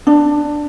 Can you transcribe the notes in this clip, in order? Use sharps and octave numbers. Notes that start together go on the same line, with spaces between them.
D4